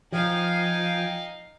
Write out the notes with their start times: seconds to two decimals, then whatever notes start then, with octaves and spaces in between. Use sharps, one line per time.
0.12 F3 D#4 F5 G5 G#5